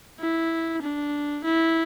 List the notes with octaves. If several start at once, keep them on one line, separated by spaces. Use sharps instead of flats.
E4
D4
E4